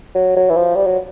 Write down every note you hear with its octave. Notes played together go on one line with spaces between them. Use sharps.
F#3
F#3
E3
F3
G3
F#3